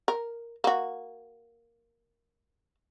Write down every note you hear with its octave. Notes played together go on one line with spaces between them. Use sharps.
A#4
A#3 F#4